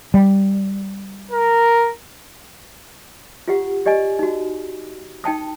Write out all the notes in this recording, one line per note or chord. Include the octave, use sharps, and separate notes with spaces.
G3
A#4
F4 G4 F#5
G4 D5 D#5 G#5
D#4 F#4
D#4 G5 A5 D#6